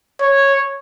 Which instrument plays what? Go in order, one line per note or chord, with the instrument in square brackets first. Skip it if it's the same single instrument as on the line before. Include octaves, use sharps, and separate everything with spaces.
[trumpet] C#5